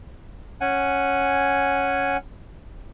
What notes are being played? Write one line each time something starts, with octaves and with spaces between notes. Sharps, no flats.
C#4 F#5 G#5